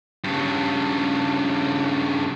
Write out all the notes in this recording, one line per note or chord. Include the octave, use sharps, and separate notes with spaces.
G2 C#3